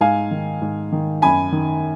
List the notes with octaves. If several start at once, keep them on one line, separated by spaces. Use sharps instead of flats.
G#2 F5 G#5
D#3
G#2
D#3
F#2 G#5 B5
D#3